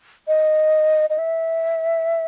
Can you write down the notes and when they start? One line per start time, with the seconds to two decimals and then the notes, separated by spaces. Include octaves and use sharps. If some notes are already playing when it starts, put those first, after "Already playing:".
0.28 D#5
1.10 D#5
1.18 E5